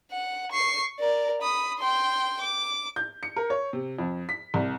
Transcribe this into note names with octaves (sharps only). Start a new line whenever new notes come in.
F#5
C#6 C7
A#4 D5
B5 D#6
G5 C6
D6
G6
C#7
A#4
C#5
C3
F2
B6
C2